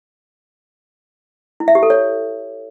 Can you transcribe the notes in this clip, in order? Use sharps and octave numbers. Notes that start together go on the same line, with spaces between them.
E4
E5
G4
A4
C#5